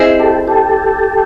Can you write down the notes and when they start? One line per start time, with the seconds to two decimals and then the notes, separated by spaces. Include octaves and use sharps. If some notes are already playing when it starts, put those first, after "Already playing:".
Already playing: C4 E4 G#4 C5 D#5
0.20 G4 A4
0.47 G4 A4